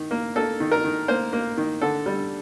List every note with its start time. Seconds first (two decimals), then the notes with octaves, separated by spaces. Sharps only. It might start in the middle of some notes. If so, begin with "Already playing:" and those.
Already playing: D#3
0.11 A#3
0.35 A#3 A4
0.60 D#3
0.72 A#4
0.84 D#3
1.08 A#3 C5
1.33 A#3
1.57 D#3
1.81 D3 A4
2.06 G3